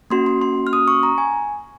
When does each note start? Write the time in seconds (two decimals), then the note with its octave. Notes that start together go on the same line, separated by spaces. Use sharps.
0.10 A#3 C#4 F#4 C6
0.26 C6
0.42 C6
0.67 F6
0.73 D#6
0.88 C#6
1.03 A#5
1.18 G#5